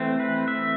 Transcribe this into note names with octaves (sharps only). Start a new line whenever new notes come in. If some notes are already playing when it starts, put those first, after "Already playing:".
Already playing: E3 A3 C4
B4
E5